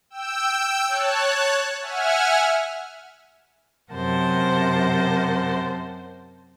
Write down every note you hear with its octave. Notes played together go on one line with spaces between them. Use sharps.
G5 E6
C#5 A5 F#6
E5 F#5 G#5 F6
F#2 C3 A#4 C5 F#5 A5